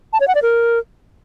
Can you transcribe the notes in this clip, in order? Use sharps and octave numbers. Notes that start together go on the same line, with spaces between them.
A5
C#5
F#5
D5
A#4